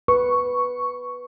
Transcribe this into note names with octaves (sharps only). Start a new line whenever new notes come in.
B4 C#6